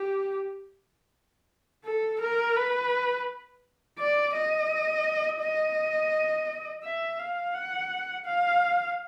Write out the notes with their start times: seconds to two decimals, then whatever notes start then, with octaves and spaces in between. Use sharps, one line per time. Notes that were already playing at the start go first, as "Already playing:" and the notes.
Already playing: G4
1.85 A4
2.21 A#4
2.56 B4
3.99 D5
4.34 D#5
5.41 D#5
6.84 E5
7.19 F5
7.54 F#5
8.26 F5